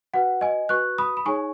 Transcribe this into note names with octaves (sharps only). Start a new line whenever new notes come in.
F#4 B4 F#5
D#5 G#5
F#4 B4 C#6 F#6
B5 D#6
B5
D#4 G#4 C#5 G#5 C#6